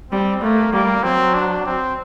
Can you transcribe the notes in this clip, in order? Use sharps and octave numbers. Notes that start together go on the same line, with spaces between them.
G3 C4
A3 A#3
G3 A#3
F#3 C4
D4
C4